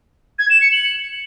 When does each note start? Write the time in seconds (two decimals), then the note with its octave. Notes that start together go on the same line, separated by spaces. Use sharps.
0.39 G#6
0.50 E7
0.61 C#7
0.72 F#7